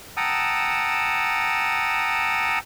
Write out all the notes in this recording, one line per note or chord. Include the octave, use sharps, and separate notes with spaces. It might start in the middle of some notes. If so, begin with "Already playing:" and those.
F#5 G5 A5 A#5 D#6 E6